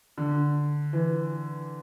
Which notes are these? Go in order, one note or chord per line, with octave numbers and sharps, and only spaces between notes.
D3
E3